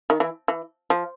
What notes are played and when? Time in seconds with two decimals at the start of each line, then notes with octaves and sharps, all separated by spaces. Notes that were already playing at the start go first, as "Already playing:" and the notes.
0.10 D#3
0.20 E3
0.48 E3
0.90 F3